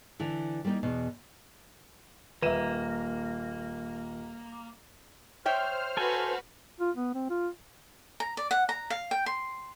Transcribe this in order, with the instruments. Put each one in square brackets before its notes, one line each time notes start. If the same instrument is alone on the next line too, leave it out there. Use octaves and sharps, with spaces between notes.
[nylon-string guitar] D3 E3 E4
G3 A#3 D#4
E2 B2
[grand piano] D#1 D#7 E7 [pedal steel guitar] A#3 [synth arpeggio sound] B4 E5
[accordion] C5 F6 [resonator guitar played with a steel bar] C#5 E5 G5
[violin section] F#4 B4 [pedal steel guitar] A4 G#5
[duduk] F4
B3
C4
F4
[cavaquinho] A#5
D5
F#5
A#5
F5
G5
C6